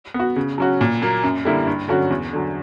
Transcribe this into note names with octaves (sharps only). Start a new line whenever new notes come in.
B3
F#4
C#3
F#3 C#4 F#4
A#2
F#3 A#3
F#2
D3 G3 A#3 E4
G2
D3 F#3 C#4 F#4
E2
D3 F#3